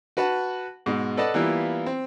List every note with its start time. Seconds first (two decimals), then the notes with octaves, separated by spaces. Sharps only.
0.17 F#4 B4 F#5 A5
0.86 G#2 B2 G#3
1.17 A4 B4 D5 D#5 F#5 A5
1.34 E3 G3 A#3 B3 E4 F4
1.86 C4